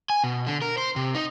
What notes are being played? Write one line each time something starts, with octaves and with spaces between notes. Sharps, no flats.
G#5
B2
D3
A#4
C5
C3
D#4